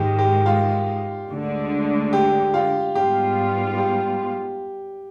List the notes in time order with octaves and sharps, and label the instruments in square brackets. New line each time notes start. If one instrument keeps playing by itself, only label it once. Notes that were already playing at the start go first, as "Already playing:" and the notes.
Already playing: [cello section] G#2 D#3 G#3 [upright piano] G4
[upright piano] G4
F4
[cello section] D2 D3 G#3
[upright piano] G4
F4
[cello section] G#2 G3 B3 F4 [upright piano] G4
[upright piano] G4